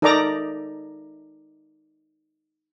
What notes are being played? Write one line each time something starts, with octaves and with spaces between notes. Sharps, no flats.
D#4 A4 A#4 D5 A#5 D6